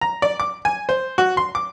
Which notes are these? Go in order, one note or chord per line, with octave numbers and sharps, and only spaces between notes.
A#5
D5
D6
G#5
C5
F#4
C6
D6